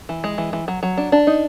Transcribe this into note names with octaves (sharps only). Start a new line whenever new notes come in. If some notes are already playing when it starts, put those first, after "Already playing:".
E3
G#3
E3
E3
F#3
F#3
D4
D4
D#4